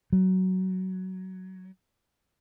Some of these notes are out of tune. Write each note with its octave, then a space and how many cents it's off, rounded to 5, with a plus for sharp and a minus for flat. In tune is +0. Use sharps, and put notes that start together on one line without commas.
F#3 +15